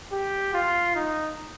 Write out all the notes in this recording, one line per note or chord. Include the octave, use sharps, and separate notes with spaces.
G4
F4
D#4